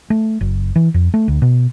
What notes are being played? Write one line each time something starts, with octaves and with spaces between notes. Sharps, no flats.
A3
F#1
E3
F2
A3
D2
B2